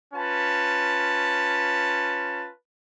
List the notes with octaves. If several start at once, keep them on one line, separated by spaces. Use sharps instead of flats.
C#4 F4 B4 A5